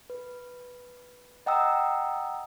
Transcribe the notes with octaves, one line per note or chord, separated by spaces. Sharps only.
B4
D#5 F#5 G5 A#5 D#6 E6